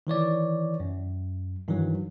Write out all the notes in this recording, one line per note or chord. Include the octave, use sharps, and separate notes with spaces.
D#3 E3 C#5 D5
F#2
G2 D#3 E3 F#3